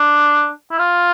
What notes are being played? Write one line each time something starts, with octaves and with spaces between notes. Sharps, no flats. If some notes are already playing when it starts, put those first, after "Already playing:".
Already playing: D4
E4
F4